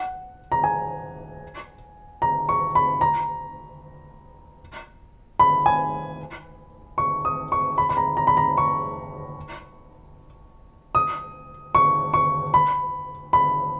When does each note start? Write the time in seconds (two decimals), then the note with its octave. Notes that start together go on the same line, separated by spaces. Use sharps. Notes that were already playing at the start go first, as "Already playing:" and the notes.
Already playing: F#5
0.52 A#5
0.64 G#5
2.22 A#5
2.49 C#6
2.75 B5
3.01 A#5
5.39 B5
5.66 G#5
6.98 C#6
7.25 D#6
7.52 C#6
7.78 B5
7.89 B5
7.97 A#5
8.17 A#5
8.27 B5
8.37 A#5
8.58 C#6
10.95 D#6
11.75 C#6
12.14 C#6
12.54 B5
13.33 B5